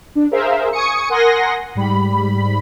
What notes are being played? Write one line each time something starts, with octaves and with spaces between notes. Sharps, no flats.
D4
G#4 A#4 C5 E5 F5
G#5 C#6 D#6 C#7
A#4 F#5 G#5 C6 D#6 A#6
G#2 G3 B5